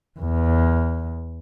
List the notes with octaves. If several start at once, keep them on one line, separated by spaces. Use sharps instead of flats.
E2